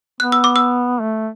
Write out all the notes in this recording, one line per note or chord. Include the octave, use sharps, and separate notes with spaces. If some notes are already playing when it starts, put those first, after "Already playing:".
B3 F#6
E6
D6
E6
A3